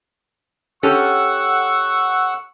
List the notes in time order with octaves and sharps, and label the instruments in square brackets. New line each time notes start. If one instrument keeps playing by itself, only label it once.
[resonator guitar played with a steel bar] C#4 G4 A4 [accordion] F#5 E6 [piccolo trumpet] C#6